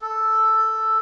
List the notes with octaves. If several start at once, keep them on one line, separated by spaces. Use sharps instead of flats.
A4